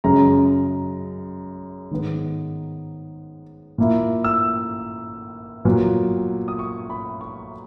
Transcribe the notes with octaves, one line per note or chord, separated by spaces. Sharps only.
F#2 C#3 G#3 A#5
G#2 D#3 G#3 B3
A#2 A#3 E4
E6
A#2 F#3 B3
D#6
C#6
B5
C#6